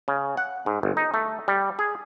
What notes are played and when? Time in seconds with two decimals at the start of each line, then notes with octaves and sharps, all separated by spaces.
0.08 C#3
0.37 F#5
0.66 G#2
0.83 G1
0.97 D#4
1.14 A3
1.48 G3
1.79 G#4